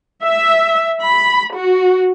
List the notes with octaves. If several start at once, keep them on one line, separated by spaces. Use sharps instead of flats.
E5
B5
F#4